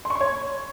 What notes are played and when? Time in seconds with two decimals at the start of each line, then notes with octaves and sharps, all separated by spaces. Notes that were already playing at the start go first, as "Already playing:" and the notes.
0.05 C6
0.10 C#6
0.15 C6
0.21 C#5